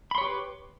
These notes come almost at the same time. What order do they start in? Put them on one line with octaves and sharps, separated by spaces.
B5 C6 C#5 G4 B4